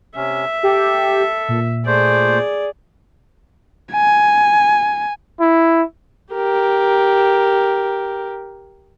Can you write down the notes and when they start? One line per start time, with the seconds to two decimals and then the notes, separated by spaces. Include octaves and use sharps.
0.16 C3 C#4 E5
0.63 G4 A4
1.49 A#2
1.86 A3 G#4 C5 D5
3.93 G#5
5.41 E4
6.33 G4 A#4